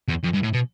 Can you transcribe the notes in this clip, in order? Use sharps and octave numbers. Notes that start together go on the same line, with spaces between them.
E2
F2
G2
A2
B2